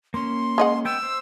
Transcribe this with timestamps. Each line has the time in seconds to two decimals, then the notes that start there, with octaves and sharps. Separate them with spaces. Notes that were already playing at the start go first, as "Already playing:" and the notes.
0.14 A#3 C#4 C6
0.58 G#3 D#5 F#5
0.85 B3 G5 E6
1.03 C5